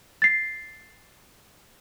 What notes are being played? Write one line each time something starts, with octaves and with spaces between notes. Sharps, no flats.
A6 C7